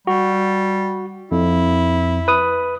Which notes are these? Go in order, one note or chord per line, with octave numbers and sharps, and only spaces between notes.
G3 F#4
F2 E4
B4 D#6